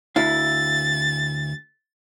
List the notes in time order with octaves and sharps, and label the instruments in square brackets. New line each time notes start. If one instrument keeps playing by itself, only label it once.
[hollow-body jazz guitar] D2 E4 F5 [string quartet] A6